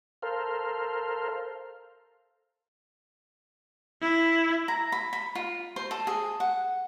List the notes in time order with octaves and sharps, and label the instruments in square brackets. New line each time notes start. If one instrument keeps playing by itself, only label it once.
[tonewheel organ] A4 A#4 C5 F5
[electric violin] E4
[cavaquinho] A#5
B5
B5
F4
C5
A4
G#4
F#5